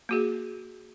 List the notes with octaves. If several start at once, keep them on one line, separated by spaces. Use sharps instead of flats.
A#3 F#4 G#4